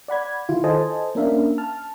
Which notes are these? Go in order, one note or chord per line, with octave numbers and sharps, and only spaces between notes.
D5 F#5 B5 G#6
D#3 E4 F4
A4 C5 D#5 G#5 A5
A#3 C#4 D4 A#4 E5 F5
A5 F6